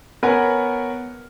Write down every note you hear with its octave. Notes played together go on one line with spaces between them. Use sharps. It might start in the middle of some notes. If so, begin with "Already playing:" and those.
B3 A#4 B4 C#5 F#5 G#5